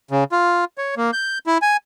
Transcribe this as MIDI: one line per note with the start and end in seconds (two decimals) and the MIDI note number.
0.11 0.24 49
0.32 0.65 65
0.78 0.95 73
0.97 1.11 58
1.13 1.38 91
1.47 1.58 64
1.62 1.77 80